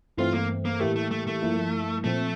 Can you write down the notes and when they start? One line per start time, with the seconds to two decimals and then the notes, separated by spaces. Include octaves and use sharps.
0.18 G2 E3 A3 C4 F4
0.33 A#3
0.65 A#3
0.80 A2 E3 A3 A#3 E4 G4
0.96 A3
1.11 A3
1.27 A3
1.42 G2 F3 A#3 E4
2.04 A#2 F3 A3 C4